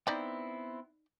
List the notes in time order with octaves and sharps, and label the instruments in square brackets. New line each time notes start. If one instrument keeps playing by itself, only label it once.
[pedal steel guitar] B3 C4 E4 [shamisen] D#4 D5 G5